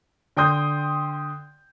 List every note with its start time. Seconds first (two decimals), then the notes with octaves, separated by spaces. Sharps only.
0.37 D3 G5 C6 D#6 G6